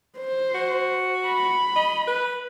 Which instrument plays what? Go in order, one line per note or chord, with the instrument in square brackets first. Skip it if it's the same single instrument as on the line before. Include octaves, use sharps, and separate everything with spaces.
[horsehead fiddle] C5
[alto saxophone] F#4
[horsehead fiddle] B5
[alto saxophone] D#5
B4